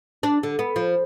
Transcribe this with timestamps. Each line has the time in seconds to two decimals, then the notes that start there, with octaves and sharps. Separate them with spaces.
0.23 D4
0.43 D3
0.59 B3
0.76 F3